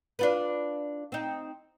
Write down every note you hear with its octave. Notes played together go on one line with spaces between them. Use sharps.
D4 F4 B4
C4 D#4